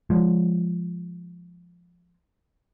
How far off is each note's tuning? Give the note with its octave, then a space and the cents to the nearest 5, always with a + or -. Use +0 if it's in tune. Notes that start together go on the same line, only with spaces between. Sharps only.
F3 +0 G#3 +0